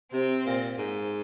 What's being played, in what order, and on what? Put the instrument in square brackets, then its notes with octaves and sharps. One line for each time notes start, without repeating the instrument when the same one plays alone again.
[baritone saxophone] C3 [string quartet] C4
[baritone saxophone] A#2
G#2